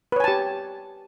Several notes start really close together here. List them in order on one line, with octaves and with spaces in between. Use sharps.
B4 C#5 G#5 A5 G4